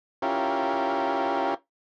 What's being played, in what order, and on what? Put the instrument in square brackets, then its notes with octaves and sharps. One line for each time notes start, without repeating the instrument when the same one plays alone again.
[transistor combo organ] C#4 E4 F4 G4 A#4